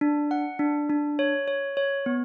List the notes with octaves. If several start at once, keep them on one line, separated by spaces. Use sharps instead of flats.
D4
F#5
D4
D4
C#5
C#5
C#5
B3